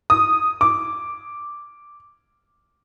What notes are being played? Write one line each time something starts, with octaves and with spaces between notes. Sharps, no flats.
D#6
D6